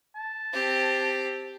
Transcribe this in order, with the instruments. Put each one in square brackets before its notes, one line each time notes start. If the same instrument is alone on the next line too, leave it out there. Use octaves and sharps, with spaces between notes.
[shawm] A5
[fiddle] C4 G4